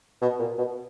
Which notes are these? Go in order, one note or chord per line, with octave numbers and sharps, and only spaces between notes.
B2
A#2
B2